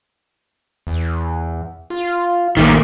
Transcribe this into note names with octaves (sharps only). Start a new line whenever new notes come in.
E2
F4
A#1 D#3 A3 A#3